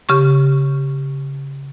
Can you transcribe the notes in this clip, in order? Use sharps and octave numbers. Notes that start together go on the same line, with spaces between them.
C#3 G4 C#6